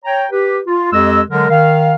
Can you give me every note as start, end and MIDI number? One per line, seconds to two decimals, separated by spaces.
0.05 0.25 73
0.05 0.25 79
0.05 0.25 82
0.31 0.59 67
0.31 0.59 71
0.67 0.91 65
0.93 1.21 41
0.93 1.21 56
0.93 1.21 67
0.93 1.21 75
0.93 1.21 88
1.30 1.47 50
1.30 1.47 54
1.30 1.47 56
1.30 1.47 70
1.50 1.95 51
1.50 1.95 77